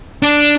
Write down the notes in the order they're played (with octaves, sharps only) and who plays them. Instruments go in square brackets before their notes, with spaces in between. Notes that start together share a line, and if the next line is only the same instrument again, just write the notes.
[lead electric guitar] D4